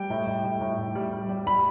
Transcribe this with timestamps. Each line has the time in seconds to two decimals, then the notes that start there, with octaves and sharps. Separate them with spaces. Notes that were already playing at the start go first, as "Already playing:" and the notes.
Already playing: G3 G5
0.10 A2
0.27 A2
0.44 A2
0.61 A2
0.79 A2
0.95 G3
1.13 G3
1.29 G3
1.47 G3 B5